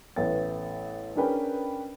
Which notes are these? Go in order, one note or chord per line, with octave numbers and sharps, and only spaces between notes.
A1 A3 B3 G5 A6
C#4 D4 G#4 A#4 B4 G5